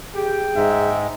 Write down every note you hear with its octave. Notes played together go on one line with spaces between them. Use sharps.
G4 G#4 G5
G#2 G#3 E5